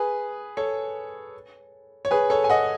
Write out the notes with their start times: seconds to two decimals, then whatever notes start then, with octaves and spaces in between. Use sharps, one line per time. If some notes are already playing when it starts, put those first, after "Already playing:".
Already playing: G#4 B4
0.57 A4 C#5
2.05 C#5
2.11 G#4 B4
2.30 A4 C#5
2.44 G#5
2.50 D#5 F#5